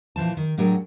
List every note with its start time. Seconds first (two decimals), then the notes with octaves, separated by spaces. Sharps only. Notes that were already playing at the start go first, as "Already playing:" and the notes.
0.16 A#2 E3 F3 A5
0.37 D#3
0.58 A2 F#3 D4 G#4 A#4